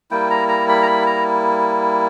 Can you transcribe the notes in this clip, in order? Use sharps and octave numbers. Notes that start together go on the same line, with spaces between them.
G3 A#3 E4 G5
A#5
A#5
B5
A#5
B5
A#5